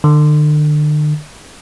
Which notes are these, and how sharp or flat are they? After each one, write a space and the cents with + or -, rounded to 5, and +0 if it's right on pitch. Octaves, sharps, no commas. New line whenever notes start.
D3 +40